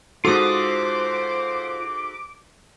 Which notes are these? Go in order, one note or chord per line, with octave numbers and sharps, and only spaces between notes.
G#2 F4 F#4 A4 C5 D6 D#6